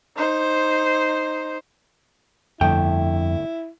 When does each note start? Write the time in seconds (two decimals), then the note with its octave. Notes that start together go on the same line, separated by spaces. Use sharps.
0.16 D#4 C5
2.61 G1 F2 A3 E4 G5